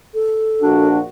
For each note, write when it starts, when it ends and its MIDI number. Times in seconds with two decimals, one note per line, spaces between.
0.14 0.87 69
0.62 1.05 34
0.62 1.05 46
0.62 0.99 62
0.62 1.05 66